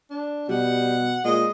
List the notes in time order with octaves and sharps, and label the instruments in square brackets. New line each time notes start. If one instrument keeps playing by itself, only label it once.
[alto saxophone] D4
[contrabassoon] B2 [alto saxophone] G3 [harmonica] F#5
[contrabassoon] A#2 [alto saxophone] G#3 [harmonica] D#5